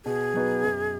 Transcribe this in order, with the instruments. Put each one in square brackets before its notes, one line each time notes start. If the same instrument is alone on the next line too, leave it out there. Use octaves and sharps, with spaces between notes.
[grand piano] B2 [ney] G#4
[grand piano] F#3 B3 D#4 F#4
F#2